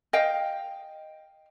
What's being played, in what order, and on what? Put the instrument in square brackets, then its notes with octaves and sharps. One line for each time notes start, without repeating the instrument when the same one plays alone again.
[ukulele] D#5 F5 G5